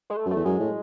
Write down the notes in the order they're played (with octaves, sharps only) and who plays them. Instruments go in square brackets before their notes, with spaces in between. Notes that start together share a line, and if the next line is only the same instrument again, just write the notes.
[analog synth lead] G#3
A3
[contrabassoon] F#2
[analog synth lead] A3
[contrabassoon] E2
[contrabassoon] F#2 [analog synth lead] G#3
[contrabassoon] A2